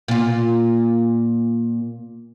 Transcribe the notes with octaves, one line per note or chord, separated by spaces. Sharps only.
A#2 F4